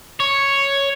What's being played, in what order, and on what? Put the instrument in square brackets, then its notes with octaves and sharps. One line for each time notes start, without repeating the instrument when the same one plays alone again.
[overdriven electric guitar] C#5